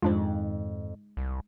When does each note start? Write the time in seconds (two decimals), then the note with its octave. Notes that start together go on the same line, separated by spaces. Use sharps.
0.02 F2 G#2 D#3 F3 G#3 D4 D#4 F4
1.17 C2